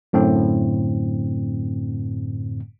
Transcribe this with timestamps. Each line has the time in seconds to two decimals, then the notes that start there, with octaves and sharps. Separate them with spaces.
0.13 F#2 A2 D3 C4